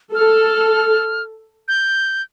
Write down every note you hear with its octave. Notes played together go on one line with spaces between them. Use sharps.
A4 F6
G6